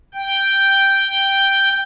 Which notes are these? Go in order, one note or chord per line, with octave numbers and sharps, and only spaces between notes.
G5 G6